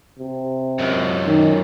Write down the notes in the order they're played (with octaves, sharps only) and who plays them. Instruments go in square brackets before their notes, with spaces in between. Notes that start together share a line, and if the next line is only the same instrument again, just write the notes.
[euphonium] C3
[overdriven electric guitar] C#2 F#2
[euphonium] D#3